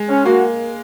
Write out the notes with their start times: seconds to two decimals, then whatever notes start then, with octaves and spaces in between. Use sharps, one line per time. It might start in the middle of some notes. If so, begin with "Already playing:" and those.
Already playing: G#3
0.09 C#4
0.26 A#3 F#4